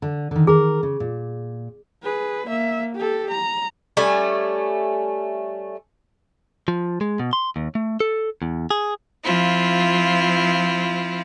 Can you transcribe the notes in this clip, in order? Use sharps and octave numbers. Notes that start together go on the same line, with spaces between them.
D3
D3 D#3
D#3 G#4 A#4
C#3
A#2
G#4 B4
A#3 E5
G4 A4
A#5
G3 A3 C#4 G#5
F3
G#3
B2
C6
D#2
A3
A4
E2
G#4
F3 C4 E4 F4